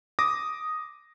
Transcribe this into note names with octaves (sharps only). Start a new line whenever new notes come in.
D6 D#6 A#6